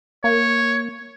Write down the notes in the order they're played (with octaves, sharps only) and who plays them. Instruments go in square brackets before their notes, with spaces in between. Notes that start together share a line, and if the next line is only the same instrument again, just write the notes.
[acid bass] A#3 [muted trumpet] C#5